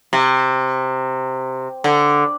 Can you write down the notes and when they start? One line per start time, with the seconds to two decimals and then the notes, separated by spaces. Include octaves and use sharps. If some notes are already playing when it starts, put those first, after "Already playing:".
0.13 C3
1.84 D3